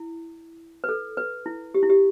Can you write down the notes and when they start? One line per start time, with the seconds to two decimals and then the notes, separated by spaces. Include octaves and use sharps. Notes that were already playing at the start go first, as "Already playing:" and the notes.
Already playing: E4
0.84 B4
0.89 A4
1.17 B4
1.46 E4
1.74 G4
1.83 E4
1.90 G4